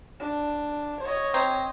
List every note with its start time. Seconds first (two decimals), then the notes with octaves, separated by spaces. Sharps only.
0.20 D4
1.01 C#5 D#5
1.34 C4 A#5